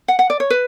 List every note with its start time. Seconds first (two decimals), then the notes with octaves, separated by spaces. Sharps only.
0.08 F#5
0.19 F#5
0.30 D5
0.40 C#5
0.50 B4